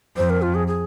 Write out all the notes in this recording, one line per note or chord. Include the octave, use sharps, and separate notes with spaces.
F2 C5
A#4
F4
G#4
G#4